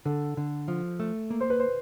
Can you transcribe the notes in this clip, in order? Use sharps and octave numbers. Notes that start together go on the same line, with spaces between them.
D3 A4
D3
F3
A3
A#3
C5
B4
C5